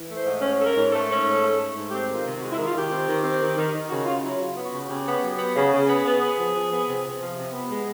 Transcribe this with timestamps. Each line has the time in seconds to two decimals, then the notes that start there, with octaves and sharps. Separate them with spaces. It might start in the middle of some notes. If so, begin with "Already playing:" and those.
Already playing: E3
0.09 A3
0.17 C5
0.25 G#2
0.42 C#4
0.59 C#4 A4
0.67 A#4
0.75 G#2
0.92 A3 A4
1.08 C#4
1.24 G#2
1.40 A3
1.58 A3
1.74 G#2
1.91 C4 G4
2.08 D#3
2.15 F4
2.23 C3
2.40 G#3 F#4
2.52 E4
2.57 D#3
2.65 F4
2.73 D#3 G4
2.89 C4
3.06 D#3
3.23 C4
3.39 D#3
3.56 D#3
3.73 D#3
3.89 C#3 F#4
4.05 C#3 F4
4.22 F#3 E4
4.39 C#3 F4
4.55 B3
4.64 F#4
4.71 C#3
4.87 C#3 G4
5.05 B3
5.21 F#3
5.37 B3
5.54 C#3
5.70 C#3
5.87 B3 G#4
6.04 B3
6.19 B3
6.37 F3
6.53 F3
6.70 B3
6.86 C3
7.03 C3
7.20 F3
7.35 C3
7.52 B3
7.68 G#3